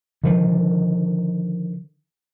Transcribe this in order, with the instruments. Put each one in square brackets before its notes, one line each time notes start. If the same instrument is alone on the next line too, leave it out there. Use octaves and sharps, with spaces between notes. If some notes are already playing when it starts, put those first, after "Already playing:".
[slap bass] D3 D#3 F3